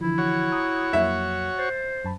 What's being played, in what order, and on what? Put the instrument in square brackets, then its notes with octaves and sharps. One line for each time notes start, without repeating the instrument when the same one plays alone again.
[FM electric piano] D3 E3 F3 [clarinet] E4
[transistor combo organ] F#4 C#5
[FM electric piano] A#5 D#6
[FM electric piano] F2 F#3 A#3 [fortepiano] E5
[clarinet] C5 [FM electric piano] A6
[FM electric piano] F#2 A5 B5